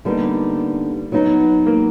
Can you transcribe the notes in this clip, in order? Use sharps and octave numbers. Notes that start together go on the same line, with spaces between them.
D3 G3 A#3 B3 D#4
F#3 B3 D#4
A#3